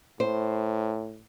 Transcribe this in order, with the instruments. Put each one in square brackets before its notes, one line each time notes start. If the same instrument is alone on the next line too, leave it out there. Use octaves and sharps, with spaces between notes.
[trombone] A2 [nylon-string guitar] C5